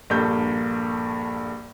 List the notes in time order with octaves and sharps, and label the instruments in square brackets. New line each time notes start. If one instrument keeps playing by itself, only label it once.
[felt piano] A#1 G2 A#3 A4 G6